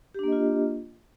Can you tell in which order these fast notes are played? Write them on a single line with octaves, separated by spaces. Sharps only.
G4 D4 A#3 D#5 F4